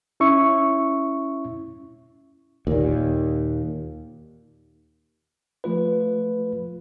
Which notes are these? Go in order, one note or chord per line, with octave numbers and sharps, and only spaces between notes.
C#4 E4 E5 C#6
D#2 A#2
F3 A3 F4 B4